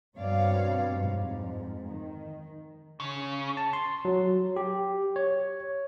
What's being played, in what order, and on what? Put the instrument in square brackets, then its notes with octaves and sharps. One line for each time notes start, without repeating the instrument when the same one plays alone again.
[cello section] G2 B2 C4 C#5 D5 F5
F2 G#2
D#3
[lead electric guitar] C#3
[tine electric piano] A5
C6
F#3
G4
C#5